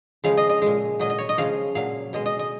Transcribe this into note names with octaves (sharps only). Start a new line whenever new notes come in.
C#3 F3 G#3 F5
D#5
D#5
A#2 G#3
A#2 F#3 D#5
D#5
C#5
D#5
C#3 F3 G#3 F5
A#2 F#3 F5
B2 G#3 D#5
D#5
D#5